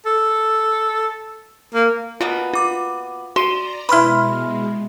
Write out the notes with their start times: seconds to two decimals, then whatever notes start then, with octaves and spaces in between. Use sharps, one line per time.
0.06 A4
1.75 A#3
2.21 B2 A#3 B3 F4
2.54 F4 D6
3.36 F#4 D5 A#5 C6 D#7 G7
3.89 B2 G#3 E4 B4 B5 C6 F6